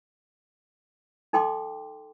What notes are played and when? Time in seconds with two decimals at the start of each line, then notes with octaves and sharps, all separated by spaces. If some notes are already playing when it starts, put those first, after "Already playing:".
1.33 D#4 A4 G5 C6 D6